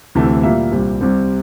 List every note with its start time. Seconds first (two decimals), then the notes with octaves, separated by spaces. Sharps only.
0.15 D2 C3 E3 A3
0.43 A#2 G3 A#3 E5
0.72 C2 A#2 G3 C4
1.01 C2 C3 G3 C4